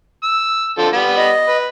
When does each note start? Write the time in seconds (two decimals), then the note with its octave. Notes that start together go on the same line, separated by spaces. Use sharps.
0.24 E6
0.78 D3 F3 A4
0.93 G3 B3 B5
1.17 D#5
1.48 B4